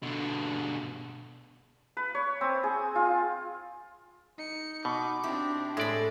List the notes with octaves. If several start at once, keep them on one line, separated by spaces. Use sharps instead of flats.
B2 D3
B4
C#5
C4
G#4
F4
D#4 C#7
B2 D6
C4 D4 E4 G4
A2 G#3 D5 E5 B5